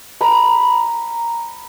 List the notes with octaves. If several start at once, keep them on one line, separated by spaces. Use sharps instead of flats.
A#5 B5